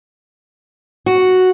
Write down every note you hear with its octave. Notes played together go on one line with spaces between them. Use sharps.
F#4